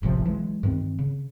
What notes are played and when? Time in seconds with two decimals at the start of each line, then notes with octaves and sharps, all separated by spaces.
0.02 E1 A1 C3 F3
0.25 E3 F#3 G#3
0.63 G2 D#3 C4
0.99 C#3